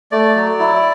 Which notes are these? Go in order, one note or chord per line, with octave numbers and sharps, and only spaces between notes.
A3 D5
F#3
E4